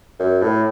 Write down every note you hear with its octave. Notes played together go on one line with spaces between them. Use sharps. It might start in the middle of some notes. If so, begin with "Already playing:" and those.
F#2
A2